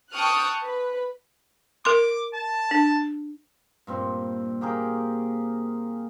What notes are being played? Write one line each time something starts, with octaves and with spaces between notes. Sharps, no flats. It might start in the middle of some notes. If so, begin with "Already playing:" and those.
G5 A5 C#6 D#6 F6 F#6
B4
A#4 C6 D6
A5
D4
G2 A#2 C4
A#3 G4 G#4 A#4